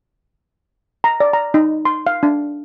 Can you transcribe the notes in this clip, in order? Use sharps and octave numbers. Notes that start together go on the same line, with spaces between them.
A#5
D5
A#5
D#4
C6
F5
D4